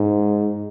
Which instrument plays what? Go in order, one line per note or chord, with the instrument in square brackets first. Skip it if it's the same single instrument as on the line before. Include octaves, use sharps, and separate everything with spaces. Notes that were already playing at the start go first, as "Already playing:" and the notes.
Already playing: [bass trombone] G#2